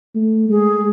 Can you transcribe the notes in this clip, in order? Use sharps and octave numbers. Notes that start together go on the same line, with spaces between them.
A3
G#3 G#4